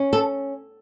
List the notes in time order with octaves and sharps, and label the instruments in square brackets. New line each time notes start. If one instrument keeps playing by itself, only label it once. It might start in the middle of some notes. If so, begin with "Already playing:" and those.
Already playing: [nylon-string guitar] C#4
A4